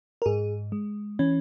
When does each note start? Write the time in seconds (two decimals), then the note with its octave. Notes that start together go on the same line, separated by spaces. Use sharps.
0.22 A#4
0.26 G#2 G#4
0.72 G#3
1.19 E3 C#4